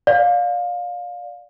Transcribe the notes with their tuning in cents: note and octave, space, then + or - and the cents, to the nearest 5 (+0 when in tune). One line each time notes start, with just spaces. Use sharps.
D5 +0 F5 +20